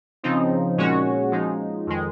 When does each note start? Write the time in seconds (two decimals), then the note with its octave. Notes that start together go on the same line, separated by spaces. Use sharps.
0.23 C#3 F3 C4 D#4
0.77 A#2 G#3 C#4 F#4 C#5
1.32 F3 G#3 D#4
1.87 F2 D#3 G#3